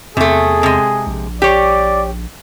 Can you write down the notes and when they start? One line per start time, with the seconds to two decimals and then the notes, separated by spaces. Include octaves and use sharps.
0.17 E2 C3 A3 G#4
0.63 C3 G#3
1.07 A#1
1.42 G4 C#5 D5